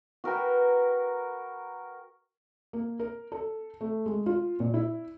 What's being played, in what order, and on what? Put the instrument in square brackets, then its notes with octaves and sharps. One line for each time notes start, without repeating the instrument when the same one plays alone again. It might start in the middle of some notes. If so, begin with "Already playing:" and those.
[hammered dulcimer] F#4 A#4 B4 G5
[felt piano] A#3
A#4
A4
A3
G#3
F4
A#2
E4